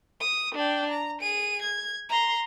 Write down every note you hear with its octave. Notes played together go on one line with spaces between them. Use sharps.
D#6
D4 G5
A#5
G#4 D#7
G#6
A#5 C6